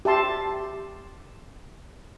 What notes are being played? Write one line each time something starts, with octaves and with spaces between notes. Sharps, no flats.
G4 E5 A5 C6